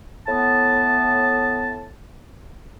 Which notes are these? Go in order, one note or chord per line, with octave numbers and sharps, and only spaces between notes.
A2 B3 A5